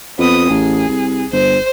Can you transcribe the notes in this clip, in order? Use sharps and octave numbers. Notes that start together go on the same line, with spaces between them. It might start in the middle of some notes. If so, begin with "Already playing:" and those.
F2 B3 D#6
A1 G#4
C2
G1 C5